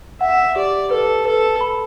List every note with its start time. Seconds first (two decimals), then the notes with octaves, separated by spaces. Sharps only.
0.21 E5 F#5
0.56 G4 D5
0.91 A4 B4
1.26 A4 B4
1.61 B5